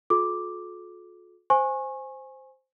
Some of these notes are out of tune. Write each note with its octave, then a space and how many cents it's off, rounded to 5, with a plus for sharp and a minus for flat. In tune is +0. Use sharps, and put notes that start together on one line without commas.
F4 +45 A4 -40 D6 +0
C5 +0 G#5 +0 C#6 -30